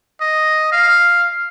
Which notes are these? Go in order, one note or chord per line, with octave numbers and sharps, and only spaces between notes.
D#5
F5